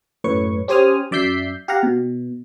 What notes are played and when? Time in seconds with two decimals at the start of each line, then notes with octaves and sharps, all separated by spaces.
0.24 F#2 A2 B4 C#5 C#6
0.68 C#4 G4 C5 G#5 D#6 F6
1.11 F#2 D5 E5 G6 B6 C7
1.68 G4 F5 F#5 A#5
1.83 B2